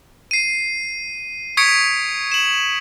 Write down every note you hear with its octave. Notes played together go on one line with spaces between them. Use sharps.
C7 D#7
C#6 D#6 G#6 B6 C#7 D7
E7 F#7